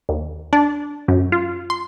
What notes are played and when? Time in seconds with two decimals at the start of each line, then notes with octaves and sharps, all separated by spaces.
0.09 D#2
0.53 D4
1.08 F#2
1.32 F4
1.70 C6